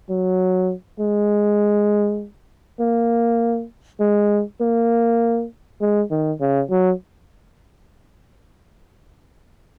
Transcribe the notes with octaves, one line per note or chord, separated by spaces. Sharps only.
F#3
G#3
A#3
G#3
A#3
G#3
D#3
C#3
F#3